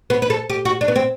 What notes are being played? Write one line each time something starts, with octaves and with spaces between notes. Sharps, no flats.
B3
B4
A4
G4
F#4
D4
B3
C4